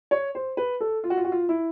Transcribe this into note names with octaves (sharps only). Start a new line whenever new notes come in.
C#5
C5
B4
A4
F4
F#4
F4
F#4
F4
E4